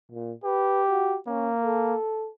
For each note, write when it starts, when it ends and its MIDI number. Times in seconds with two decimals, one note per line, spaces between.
0.12 0.32 46
0.44 1.18 67
0.44 0.81 71
0.90 1.16 66
1.27 1.95 58
1.27 1.51 61
1.64 2.29 69